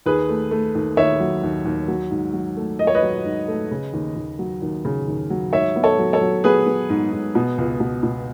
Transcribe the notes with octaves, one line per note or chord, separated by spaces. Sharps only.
D#2 G#4 B4
A3
A3
D#2
D#2 C#5 E5
F#3
D#2
D#2
F#3
G#2
F#3
A3
A3 D#5
C#5
B4 D#5
F#3
G#2
A3
C#3
D#2
D#2
F#3
D#2
C#3
D#2
F#3
G#2 C#5 E5
B3
A4 C#5
F#3
A4 C#5
F#3
B3 G#4 B4
B3
G#2
G#2
B2
C#2
B2
B2